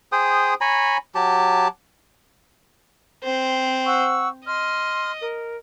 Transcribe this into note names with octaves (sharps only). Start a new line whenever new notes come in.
G#4 C5 G5 D#6
C#5 G#5 A#5 B5
F#3 G4 A5
C4 C5
F#5 C#6 E6
D#5 C6 F6
A#4